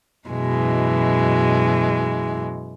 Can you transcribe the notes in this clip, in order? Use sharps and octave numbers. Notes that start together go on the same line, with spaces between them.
F#2 B2 E3 G#3